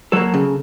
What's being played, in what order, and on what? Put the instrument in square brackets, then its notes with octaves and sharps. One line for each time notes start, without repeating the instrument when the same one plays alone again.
[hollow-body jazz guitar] F#3 A#3 A4
C#3